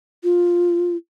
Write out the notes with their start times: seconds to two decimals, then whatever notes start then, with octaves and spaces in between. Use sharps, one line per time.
0.24 F4